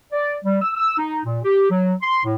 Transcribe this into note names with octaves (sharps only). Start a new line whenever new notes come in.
D5
G3
E6
E6
D#4
A#2
G4
F#3
C6
A2